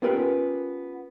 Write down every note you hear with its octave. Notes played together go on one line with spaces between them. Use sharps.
B3 C#4 F4 G4 A#4 B4